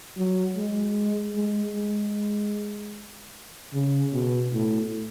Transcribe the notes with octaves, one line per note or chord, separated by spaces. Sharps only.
F#3
G#3
G#3
G#3
C#3
B2
A2